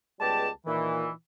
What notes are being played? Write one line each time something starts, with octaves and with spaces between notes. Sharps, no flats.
C#2 G3 G#3 B3 G4 A5
A#2 D#3 E3